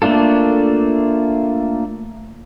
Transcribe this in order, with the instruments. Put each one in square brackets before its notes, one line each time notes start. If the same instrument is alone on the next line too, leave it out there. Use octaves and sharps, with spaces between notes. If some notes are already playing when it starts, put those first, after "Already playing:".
[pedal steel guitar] A3 A#3 D4 F4 A4